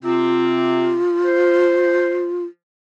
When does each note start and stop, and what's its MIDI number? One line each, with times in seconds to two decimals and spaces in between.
0.04 0.98 48
0.04 0.98 60
0.04 2.44 65
1.25 2.25 72